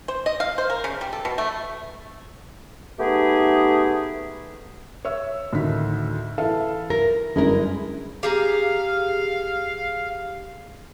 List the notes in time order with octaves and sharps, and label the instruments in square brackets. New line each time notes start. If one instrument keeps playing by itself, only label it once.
[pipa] C5
D#5
F5
C5
A#4
C#3
G3
A4
B2
A3
[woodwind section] A3 B3 D#4 G4 G#4
[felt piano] C#5 E5 E6
[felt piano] D2 B6 [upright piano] A2 D#3
[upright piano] E3 E4 [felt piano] A4 E5 F5
[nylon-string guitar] A#4 [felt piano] A#6
[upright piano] G1 F#2 [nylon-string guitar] G#3 E4 A#4
[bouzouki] G4 G#4 A#5 [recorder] F5